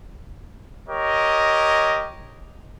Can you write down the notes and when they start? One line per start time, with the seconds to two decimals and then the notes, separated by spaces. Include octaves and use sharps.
0.88 G4 A#4 C#5 D#5